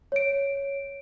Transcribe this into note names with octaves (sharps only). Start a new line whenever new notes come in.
C#5 D7